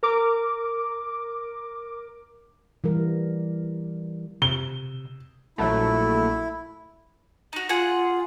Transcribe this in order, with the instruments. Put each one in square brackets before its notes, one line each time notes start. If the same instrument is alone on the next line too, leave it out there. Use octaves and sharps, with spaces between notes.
[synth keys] A#4 D6
[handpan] E3 G3 A#4
[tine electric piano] C3 [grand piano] G7
[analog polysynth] A#1 F#3 A3 [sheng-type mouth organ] E4
[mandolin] D#4 F#4
[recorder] F4 [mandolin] G#4 F#5